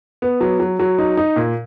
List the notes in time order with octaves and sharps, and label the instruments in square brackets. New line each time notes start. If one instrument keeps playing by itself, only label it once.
[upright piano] B3
F#3
F#3
F#3
D#4
D#4
A#2